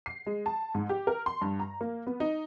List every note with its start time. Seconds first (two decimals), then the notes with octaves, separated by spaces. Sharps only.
0.06 C7
0.26 G#3
0.46 A5
0.75 G#2
0.89 G4
1.07 A#4
1.26 C6
1.41 G2
1.60 A#5
1.81 A#3
2.07 B3
2.20 D#4